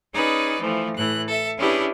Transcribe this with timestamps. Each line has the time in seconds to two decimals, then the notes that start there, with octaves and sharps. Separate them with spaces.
0.13 C#4 D#4 G#4 B4 D5
0.59 E3 F3 A3
0.97 A2 E3 F#6
1.28 A4 E5
1.57 C#4 D4 E4 G4 G#4 B4